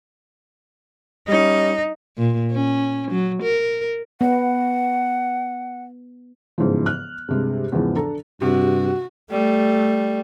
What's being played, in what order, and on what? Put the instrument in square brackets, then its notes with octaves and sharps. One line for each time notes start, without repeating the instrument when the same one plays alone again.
[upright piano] G3 C#4 [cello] D#4
[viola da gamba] A#2
C#4
F#3
A#4
[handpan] B3 [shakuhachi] F#5
[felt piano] G1 G#2 C#3 E3 F3
F6 F#6
G2 C3 G#3
E2 G#2 C#3 E3 F3
D4 A4 A#5
[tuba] G2 [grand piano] C3 [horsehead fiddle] F#4
[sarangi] G3 [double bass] A3